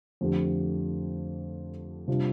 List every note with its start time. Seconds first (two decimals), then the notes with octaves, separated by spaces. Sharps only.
0.21 F2 D3 A3 C4 G4
2.08 C3 G3 D4 F4